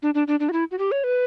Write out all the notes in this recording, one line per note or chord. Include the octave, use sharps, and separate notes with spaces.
D4
D4
D4
D4
F#4
E4
F#4
G4
C#5
B4